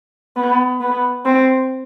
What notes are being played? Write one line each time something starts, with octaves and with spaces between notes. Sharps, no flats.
B3
B3
C4